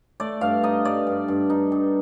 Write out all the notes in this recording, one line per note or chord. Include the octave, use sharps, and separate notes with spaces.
A3 D5
G2 F5
D#4 D#5
G2 D5
G2
G2
D#4
G2